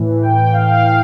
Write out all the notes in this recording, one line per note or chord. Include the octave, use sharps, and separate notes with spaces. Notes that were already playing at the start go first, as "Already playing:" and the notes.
Already playing: A2 E3
G5
F5
F5